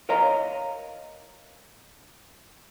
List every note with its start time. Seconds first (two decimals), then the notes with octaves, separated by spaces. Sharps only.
0.09 A#4 C#5 D#5 F5 A#5